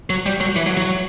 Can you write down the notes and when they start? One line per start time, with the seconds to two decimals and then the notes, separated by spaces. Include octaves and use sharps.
0.10 F#3
0.26 G3
0.41 F#3
0.56 E3
0.66 F#3
0.77 F#3